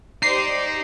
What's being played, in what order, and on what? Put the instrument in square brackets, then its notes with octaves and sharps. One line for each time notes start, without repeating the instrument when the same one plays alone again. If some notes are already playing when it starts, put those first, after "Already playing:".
[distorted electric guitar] D#4 [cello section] G4 C5 D5 [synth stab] C7